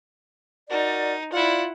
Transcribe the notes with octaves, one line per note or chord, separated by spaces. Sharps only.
D#4 F#4 A#4 D5
E4 F4 D5 F#5